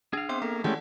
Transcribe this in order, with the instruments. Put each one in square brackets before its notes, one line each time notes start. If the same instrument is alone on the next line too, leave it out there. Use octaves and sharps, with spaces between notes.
[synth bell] D4 [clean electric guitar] G#4 F5
[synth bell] B3 C4 G5 [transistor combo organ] C5
[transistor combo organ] A#3 [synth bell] A4
[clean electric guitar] E3 C#4 [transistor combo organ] G#3 A3 G4 [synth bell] D5 F#5 A5